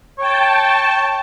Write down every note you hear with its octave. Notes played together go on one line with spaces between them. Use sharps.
C#5 G5 A5